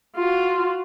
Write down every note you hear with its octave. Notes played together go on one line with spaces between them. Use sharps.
F4 F#4